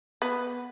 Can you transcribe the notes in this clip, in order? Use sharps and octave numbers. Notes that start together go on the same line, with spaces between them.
B3